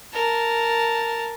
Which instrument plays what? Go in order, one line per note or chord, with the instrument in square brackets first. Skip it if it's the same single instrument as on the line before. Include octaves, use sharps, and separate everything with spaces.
[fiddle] A#4 A5